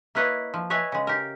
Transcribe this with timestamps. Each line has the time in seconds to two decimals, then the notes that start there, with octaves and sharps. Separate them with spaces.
0.15 A#3 E4 B4 C#5 D#5
0.54 F3
0.70 B4 C#5 D#5 E5 G#5
0.92 C#3 G#3
1.07 G4 A#4